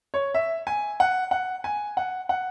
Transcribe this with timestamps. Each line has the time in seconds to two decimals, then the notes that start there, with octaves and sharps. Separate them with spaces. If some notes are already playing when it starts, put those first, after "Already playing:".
0.14 C#5
0.34 E5
0.67 G#5
1.00 F#5
1.31 F#5
1.64 G#5
1.97 F#5
2.29 F#5